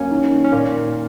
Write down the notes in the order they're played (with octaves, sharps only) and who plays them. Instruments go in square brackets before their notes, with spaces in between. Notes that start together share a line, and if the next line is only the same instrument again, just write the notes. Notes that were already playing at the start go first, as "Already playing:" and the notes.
Already playing: [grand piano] F#2 [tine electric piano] A#3 C#4
[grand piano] D#3
D#3
[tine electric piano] C#4
[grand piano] A#2 [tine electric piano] A#3